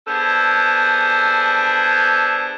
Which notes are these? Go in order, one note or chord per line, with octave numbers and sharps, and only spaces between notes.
B3 D4 G#4 A4 C5